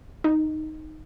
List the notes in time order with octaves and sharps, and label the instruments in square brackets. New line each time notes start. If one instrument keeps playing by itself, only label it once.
[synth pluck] D#4